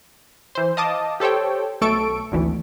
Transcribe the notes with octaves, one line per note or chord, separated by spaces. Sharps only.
E3 C5
D#5 F5 A5 D6 D#6
G4 A4 C5 C#5 G5
B1 A3 A4 C#6 D7
G#1 D2 E3